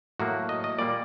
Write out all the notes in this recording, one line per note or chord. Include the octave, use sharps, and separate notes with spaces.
A2 F#3 A#3 F#4
D#5
D#5
A#2 G3 A#3 D5